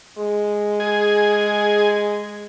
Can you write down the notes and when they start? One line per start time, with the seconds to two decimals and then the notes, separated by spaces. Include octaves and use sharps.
0.18 G#3
0.80 G#4